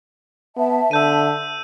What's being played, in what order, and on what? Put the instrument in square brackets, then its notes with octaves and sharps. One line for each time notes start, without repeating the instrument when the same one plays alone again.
[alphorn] B3 [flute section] E5 A5
[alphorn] D3 [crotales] E6 G6 D#7